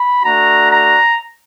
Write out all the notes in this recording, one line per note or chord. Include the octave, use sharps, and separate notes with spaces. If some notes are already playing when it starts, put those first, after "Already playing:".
Already playing: B5
A3 D4 F#4 A#5
A#5